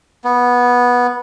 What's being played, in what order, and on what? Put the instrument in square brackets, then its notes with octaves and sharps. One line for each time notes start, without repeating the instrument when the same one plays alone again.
[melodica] B3